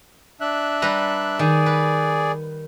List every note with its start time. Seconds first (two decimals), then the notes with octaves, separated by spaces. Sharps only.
0.41 D4 E5 F#6
0.82 G3 B4 A#5
1.39 D#3 G#4 D5
1.66 B4